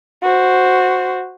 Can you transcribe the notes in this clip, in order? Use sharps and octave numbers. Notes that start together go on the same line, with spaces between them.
F#4 C5